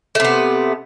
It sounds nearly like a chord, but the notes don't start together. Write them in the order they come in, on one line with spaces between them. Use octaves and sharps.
A3 C3 B3